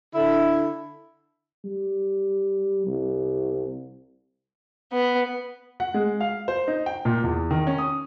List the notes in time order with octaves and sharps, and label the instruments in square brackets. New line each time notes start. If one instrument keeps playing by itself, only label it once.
[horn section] D3 E4
[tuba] G3
C2
[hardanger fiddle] B3
[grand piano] F#5
G#3
F5
C5
D#4
G5
A#2
E2
D#3
C#4
D#6